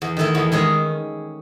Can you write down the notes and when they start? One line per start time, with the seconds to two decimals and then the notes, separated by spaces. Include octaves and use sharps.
0.02 E2
0.17 D#3 A3 E4 A4
0.35 E2
0.52 D#3 G#3 C#4 G#4